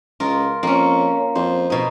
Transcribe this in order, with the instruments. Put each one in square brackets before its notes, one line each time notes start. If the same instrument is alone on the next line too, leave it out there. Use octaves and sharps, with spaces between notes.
[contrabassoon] C#2 [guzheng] F4 A#4
[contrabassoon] F2 [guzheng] A#3 C#4
[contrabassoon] F2 [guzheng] C5
[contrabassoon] F2 [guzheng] B2 D#4